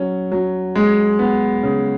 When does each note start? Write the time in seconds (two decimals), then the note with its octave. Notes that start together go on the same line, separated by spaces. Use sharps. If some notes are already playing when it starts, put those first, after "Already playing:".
Already playing: F#3 C#4
0.32 F#3
0.75 G#3
1.19 B3
1.63 C#3